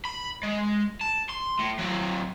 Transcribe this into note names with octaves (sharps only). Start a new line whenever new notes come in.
B5
G#3
A5
C6
A2
F#3 C4